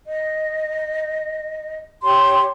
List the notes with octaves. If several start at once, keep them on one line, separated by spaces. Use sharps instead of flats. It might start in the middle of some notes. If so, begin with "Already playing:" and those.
D#5
G4 C#5 C6